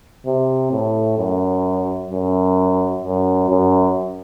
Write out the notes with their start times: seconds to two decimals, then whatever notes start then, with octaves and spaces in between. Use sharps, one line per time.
0.26 C3
0.72 A2
1.18 F#2
2.10 F#2
3.03 F#2
3.49 F#2